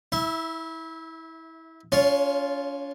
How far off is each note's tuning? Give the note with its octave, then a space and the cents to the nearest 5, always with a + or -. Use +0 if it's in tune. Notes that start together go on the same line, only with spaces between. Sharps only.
E4 -25 E5 +0
C#4 +40 F4 +0 C#5 +0